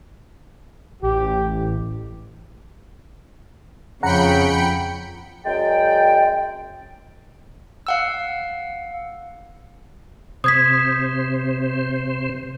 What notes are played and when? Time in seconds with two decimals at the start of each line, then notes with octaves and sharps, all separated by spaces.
1.03 A1 G4
4.03 F2 C#3 F#5 G5 A#5 B5 C#7
5.45 F#2 G#3 D5 G5
7.87 F5 F#5 E6
10.44 C3 C5 D#6 G#6 B6